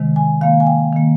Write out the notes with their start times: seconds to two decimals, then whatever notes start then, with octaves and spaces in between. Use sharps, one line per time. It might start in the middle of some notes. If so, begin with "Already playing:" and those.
Already playing: C3 D#3 G#3
0.16 G#5
0.41 D#3 A#3 F5
0.60 G#5
0.67 G5
0.93 D#3 A#3